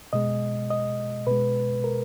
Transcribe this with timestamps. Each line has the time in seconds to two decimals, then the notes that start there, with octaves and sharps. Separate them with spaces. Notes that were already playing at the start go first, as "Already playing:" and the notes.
0.13 B2 G#3 D#5
0.70 D#5
1.27 B2 G#3 B4
1.84 A#4